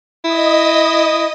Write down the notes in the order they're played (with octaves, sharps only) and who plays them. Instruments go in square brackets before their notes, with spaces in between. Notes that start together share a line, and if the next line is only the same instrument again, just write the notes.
[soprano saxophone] E4 [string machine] D#5 D#6